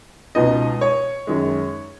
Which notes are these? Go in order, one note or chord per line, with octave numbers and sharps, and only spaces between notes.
C#2 B2 B3 D#4 D#5
C#5
F#2 D#3 G#3